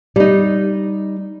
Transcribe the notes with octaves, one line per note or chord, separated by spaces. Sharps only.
G3 D#4